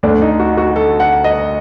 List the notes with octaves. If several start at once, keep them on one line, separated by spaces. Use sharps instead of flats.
D2 D3 A3 D4
D#4
F#4
F#4
A4
F#5
D#5